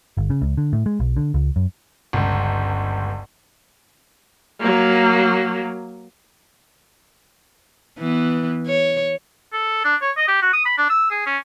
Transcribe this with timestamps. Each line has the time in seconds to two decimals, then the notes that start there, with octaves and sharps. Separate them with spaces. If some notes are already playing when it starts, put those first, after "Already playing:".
0.17 G1
0.30 C#3
0.42 C#2
0.57 D3
0.73 A2
0.86 G#3
1.00 B1
1.17 D3
1.34 C#2
1.56 F#2
2.13 G1 C#2
4.60 F#3 A#3
7.99 E3 B3
8.67 C#5
9.53 A4
9.84 D4
10.02 C#5
10.17 D#5
10.28 G4
10.42 F#4
10.53 D#6
10.66 B5
10.78 D4
10.90 E6
11.11 G#4
11.26 C#4